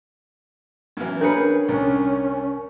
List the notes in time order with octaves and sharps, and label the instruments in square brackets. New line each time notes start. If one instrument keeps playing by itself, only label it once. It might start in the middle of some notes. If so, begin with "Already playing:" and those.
[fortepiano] F#2 E3
[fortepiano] C#4 G#4 B4 [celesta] D4 C#7 [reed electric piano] A#4
[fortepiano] C2 [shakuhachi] C#4